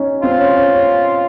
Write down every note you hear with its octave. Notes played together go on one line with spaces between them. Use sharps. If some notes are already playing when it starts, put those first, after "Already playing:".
Already playing: C#4 D#4
C4 F4
C#4
C#4
C#4